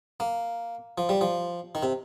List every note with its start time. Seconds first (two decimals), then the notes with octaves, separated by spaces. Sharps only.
0.20 A#3
0.98 F3
1.09 G3
1.21 F3
1.75 D#3
1.83 C3